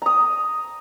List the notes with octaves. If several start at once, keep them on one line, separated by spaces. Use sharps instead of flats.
A#5 D#6